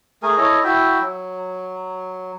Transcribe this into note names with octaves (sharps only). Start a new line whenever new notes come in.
A3 G#4 A#4 G#5
E4 A4 C#5 D#5
E4 F#4 E5 G5
F#3